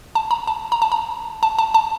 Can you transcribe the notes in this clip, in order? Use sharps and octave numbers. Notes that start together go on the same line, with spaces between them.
A5
A#5
A5
A#5
A5
A#5
A5
A5
A5